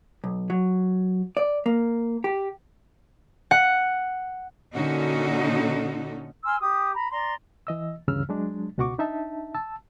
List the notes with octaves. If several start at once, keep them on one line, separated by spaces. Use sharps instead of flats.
B1
F#3
D5
A#3
G4
F#5
A#2 D3 C#4 D#4 F#4 A4
G#5 C6 E6 F6
G4 D#6
A#5 B5
D5 A#5 C6
E3 D#5 E6
D2 G2 C#3 E3 E6 F6
F#3 G#3 D4
C#2 B2 F#4 F#5 C#6 D6
D4 D#4 E5 A5
A5 E6